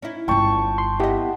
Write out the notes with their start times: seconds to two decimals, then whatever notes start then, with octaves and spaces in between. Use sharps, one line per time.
0.02 C#4 D#4 E4
0.28 G1 F4 G5 A5 C#6
0.78 C6
1.00 B3 E4 G4 D#5